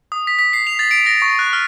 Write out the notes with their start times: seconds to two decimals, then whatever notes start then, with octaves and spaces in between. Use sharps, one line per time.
0.12 D#6
0.27 B6
0.39 B6
0.53 C7
0.67 F7
0.79 A6
0.91 D7
1.06 A#6
1.22 C#6
1.39 F#6
1.53 F6